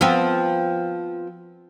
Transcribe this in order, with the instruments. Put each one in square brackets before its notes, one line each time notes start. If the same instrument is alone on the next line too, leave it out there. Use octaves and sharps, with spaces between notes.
[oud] F3 B3 C4